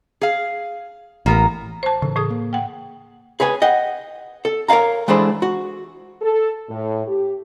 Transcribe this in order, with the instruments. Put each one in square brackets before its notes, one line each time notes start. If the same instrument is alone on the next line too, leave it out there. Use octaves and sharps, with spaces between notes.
[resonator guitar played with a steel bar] G#4 F5
[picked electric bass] A1 [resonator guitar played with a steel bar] A#3 B3 A#4
[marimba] C5 A5
[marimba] A2 [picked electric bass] C#3 E3
[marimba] A2 G#4 D#6
[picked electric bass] A#3
[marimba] F#5 G5
[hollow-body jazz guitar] G#4 B4 C#5 G#5
D#5 F#5 G5
A4
A#4 C#5 D5 F5 A#5
E3 G#3 A3 D4 C5 B5
F#4
[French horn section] A4
A2
G4